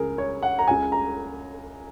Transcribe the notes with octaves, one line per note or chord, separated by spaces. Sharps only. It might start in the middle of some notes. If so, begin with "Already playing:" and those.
Already playing: C#2 C#3 G#4 A#4
C#5
F#5
A#5
C#2 C#3 G#5
A#5